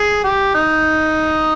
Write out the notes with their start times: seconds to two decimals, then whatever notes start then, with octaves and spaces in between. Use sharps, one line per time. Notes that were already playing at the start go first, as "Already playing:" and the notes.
Already playing: G#4
0.24 G4
0.54 D#4